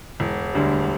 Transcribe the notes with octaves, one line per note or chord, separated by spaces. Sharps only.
E1
D2 D3 G3